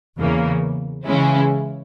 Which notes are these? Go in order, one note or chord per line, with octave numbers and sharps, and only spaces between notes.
E2 C#3 E3 A#3
C#3 E3 G#3 C#4 E4